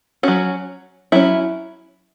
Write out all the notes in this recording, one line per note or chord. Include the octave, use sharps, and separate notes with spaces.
F#3 C#4 F#4
F#3 C#4 E4